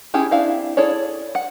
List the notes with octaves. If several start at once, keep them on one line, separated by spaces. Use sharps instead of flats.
C#4 E4 G4 G#4
C4 D4 E4 F5
E4 G#4 A4 C#5 D5
F#5